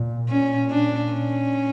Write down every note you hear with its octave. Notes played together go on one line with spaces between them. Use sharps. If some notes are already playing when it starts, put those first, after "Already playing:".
Already playing: A#2
A#2 C#4
D4
C#4